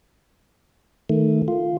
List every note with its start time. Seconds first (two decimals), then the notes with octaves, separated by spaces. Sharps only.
1.09 D#3 A3
1.48 F4